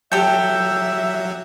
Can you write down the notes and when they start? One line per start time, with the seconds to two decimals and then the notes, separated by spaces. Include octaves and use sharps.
0.12 F#3 G4 A4 E5 G6